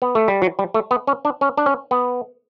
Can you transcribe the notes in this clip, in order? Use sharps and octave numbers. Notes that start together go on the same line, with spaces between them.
B3
A3
G3
F#3
G3
A3
B3
C#4
D4
C#4
D4
C#4
B3